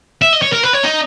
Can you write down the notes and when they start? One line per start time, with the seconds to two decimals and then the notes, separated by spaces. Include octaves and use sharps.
0.22 E5
0.33 D#5
0.42 C#5
0.53 A#4
0.63 B4
0.74 C#5
0.84 D#4